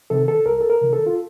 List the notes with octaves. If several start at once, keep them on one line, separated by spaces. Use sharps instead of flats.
C3 D#3 A4
A4
C2 A#4
A4
A#4
C3 D#3
A4
F4